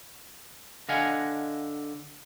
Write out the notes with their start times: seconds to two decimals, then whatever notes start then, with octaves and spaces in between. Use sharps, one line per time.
0.89 D3 D#5 F5 F#5 G#5